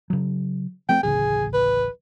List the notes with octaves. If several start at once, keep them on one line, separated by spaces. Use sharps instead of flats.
C#3 F#3
F3 A3 C4 G5
D1 A1 C#3 G#4
B4